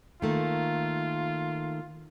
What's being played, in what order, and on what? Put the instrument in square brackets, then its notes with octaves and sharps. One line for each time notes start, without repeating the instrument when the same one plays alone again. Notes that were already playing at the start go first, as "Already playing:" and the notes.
[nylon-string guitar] D#3 A3 A#3 [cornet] F4